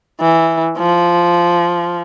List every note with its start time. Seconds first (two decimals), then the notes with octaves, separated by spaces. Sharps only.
0.21 E3
0.78 F3